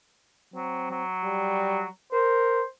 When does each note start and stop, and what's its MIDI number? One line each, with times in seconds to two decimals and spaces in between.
0.54 0.88 54
0.54 1.03 60
0.91 1.86 54
1.23 1.84 55
2.12 2.62 70
2.12 2.65 72